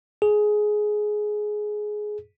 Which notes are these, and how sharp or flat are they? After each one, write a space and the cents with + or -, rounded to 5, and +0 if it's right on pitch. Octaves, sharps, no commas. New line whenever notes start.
G#4 +15